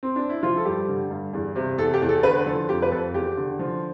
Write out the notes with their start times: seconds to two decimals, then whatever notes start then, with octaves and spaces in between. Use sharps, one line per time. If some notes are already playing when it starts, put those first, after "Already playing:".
0.03 C4
0.16 D4
0.29 E4
0.43 F3 F4
0.57 A4
0.65 G2 G4
0.88 D3
1.11 G2
1.33 E2
1.56 C3
1.78 E2 A4
1.94 G4
2.02 E2
2.09 A4
2.23 D3 B4
2.46 F3 A4
2.69 F2 G4
2.82 B4
2.91 F2 A4
3.14 E2 G4
3.37 D3
3.59 F3